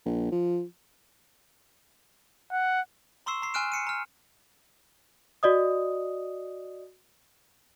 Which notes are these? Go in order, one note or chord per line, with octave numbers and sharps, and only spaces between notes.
A#1
F3
F#5
A#5 C6 C#6 E6 C7 E7
A#5 C7
G#5 C6 F6 F#6 D7 E7
C7 C#7 D#7
A#5 F6
F#4 D5 D#5 D#6